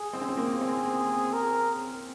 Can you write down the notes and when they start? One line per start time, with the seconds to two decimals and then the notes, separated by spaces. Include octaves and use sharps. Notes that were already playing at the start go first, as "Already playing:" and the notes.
Already playing: G#4
0.13 C4
0.21 C#4
0.28 C4
0.37 A#3
0.61 C4
1.33 A#4